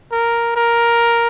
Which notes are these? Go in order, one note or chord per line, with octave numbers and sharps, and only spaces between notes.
A#4
A#4